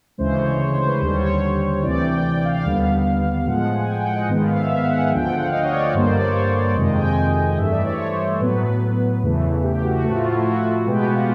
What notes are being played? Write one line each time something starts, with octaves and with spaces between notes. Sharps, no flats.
D2 C#3 E3 G#3 C5
C#5
C#5
C5
B4
D#2 D3 G3 C5
C#5
C#5
D2 C3 E3 D5
G5
G5
G5
F5
D#2 D3 G3 B3
A2 F3 G#3 F#5
G#5
G5
F#5
D#5
G#2 D#3 G#3 B3
F5
E5
F5
F#5
G#5
D2 D3 F3 G5
F#5
F5
D#5
C#5
D5
G2 D3 G3 A#3 C5
D5
C#5
C5
D5
F2 C3 D#3 G#3 D#5
G5
G#5
G5
D#5
G2 E3 A3 E5
D5
C#5
C5
A2 F#3 B3 B4
B4
E2 C#3 E3 A3
G4
F#4
A2 F3 A3 F#4
F4
E4
F4
F#4
B2 G#3 B3 G4
F#4
F4